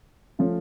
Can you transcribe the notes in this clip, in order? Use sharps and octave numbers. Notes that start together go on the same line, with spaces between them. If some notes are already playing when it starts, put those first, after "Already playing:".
F3 A3 C#4 F4